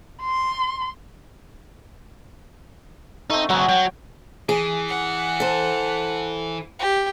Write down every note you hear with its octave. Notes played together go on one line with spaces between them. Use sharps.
C6
A3 C4 D#4
F#3 G#4 F#5 A#5 C#6
F#3 G5
E3 G#4
F#5
A4 C5
G4